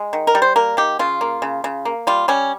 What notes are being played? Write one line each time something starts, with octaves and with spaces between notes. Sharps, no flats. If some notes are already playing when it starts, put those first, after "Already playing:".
Already playing: G#3
D#3
A#4
G3
C5
A#3 A#4
D#3 G4
C#3 F4
A#3
C#3
C#3
A#3
G3 F4
G3 C#4